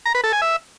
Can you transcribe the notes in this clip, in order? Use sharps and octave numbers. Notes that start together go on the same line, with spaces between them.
A#5
B4
A4
G#5
E5